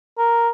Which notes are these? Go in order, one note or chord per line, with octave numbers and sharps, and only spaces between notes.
A#4